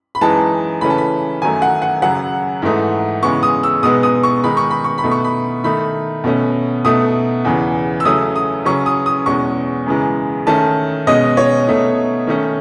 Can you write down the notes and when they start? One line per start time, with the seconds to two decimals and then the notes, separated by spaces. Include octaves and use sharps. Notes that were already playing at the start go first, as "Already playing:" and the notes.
0.15 B5
0.21 F#2 E3 G#3 D#4 A5
0.81 C#3 E3 A3 C#4 B5
0.90 A5
0.98 B5
1.42 F#2 D#3 F#3 A3 G#5
1.62 F#5
1.82 F#5
2.02 F#2 C#3 F#3 F#5
2.62 G#2 E3 A3 D#4
3.22 C#3 E3 G#3 B3 C#6
3.43 D#6
3.63 E6
3.83 B2 G#3 B3 D#4 D#6
4.03 D#6
4.23 C#6
4.44 D#3 G#3 D#4 B5
4.57 C#6
4.71 B5
4.84 C#6
4.98 B5
5.04 B2 A3 D#4
5.12 C#6
5.24 B5
5.64 D#3 A3 D#4 B5
6.24 B2 A3 C#4
6.85 B2 A3 D#4 D#6
7.45 E2 C#3 E3
8.00 E6
8.05 C#3 F#3 A3 C#4 D#6
8.36 D#6
8.65 C#3 F#3 C#4 C#6
8.86 D#6
9.06 D#6
9.26 E2 B2 G#3 C#4 C#6
9.86 F#2 C#3 E3 G#3
10.47 D#3 A3 C#4 A5
11.07 B2 G#3 C#4 D#5
11.37 C#5
11.67 B2 A3 D#4
12.27 D#3 A3 C#4